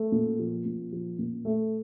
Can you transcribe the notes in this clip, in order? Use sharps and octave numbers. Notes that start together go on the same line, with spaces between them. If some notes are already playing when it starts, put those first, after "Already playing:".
Already playing: A3
A#2
F3
A#2
F3
A#2
A3